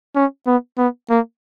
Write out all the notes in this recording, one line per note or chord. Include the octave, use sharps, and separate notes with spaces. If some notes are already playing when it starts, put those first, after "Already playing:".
C#4
B3
B3
A#3